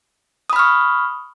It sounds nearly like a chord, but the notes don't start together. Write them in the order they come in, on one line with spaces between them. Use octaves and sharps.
D#6 B5 F6 C#6